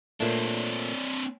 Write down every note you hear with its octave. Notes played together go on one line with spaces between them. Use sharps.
A#2 A3 C4 D4